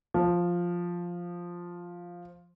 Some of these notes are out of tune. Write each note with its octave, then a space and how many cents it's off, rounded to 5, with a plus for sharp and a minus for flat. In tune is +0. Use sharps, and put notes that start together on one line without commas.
F3 +0